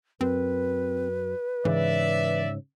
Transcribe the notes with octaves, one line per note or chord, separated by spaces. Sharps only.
F#2 C4 B4
G#2 C#3 E3 D5 E5